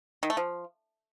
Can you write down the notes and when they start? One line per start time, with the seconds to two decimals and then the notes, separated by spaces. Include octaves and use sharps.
0.23 D#3
0.30 A3
0.37 F3